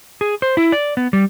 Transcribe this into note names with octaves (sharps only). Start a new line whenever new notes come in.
G#4
C5
E4
D5
B3
G3